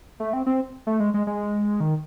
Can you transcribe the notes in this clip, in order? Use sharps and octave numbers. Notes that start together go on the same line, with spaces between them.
A3
C4
C4
A3
G#3
G#3
G#3
D#3